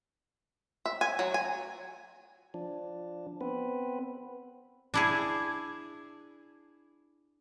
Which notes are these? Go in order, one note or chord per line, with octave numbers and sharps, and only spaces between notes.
E5
G#5
F#3
G#5
F3 D4
B3 C4 B4
D4 E4 G#4